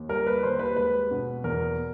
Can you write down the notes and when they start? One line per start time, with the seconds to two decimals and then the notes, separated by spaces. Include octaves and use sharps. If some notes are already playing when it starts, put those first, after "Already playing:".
Already playing: D#2
0.09 G3 A#4
0.27 B4
0.43 D#2 C5
0.59 B4
0.76 G#3 B4
1.11 B2
1.44 E2 A#4